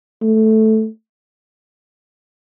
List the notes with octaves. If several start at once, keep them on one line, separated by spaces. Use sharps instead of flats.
A3